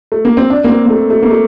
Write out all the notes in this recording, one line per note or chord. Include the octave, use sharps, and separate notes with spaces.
A3
A#3
C4
D4
A#3
C4
A#3
A3
A3
A#3
A3